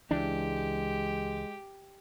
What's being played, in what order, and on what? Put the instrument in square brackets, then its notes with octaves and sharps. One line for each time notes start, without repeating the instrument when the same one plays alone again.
[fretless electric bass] C#2 E3 D4 [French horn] G#3 [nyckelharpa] G4